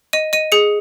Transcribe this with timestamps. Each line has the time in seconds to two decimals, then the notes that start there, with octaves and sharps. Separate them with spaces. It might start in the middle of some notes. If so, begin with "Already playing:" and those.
0.13 D#5 D#7
0.33 D#5 D#7
0.52 G#4 C#7